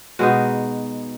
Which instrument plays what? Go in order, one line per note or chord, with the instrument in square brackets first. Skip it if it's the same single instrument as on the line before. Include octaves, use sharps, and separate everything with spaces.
[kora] B2 G#3 B3 D#4 F#4